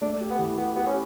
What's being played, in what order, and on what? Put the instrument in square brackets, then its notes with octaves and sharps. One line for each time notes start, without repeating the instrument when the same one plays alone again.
[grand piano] A3 [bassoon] D4
[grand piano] G4
[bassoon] B3
[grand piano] E3
[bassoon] B3 [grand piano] G4
[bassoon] B3 [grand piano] G4
[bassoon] C#4